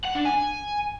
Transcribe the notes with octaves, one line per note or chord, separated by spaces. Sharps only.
F#5
D4
G#5